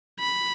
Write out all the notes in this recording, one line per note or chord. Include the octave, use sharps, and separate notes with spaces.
B5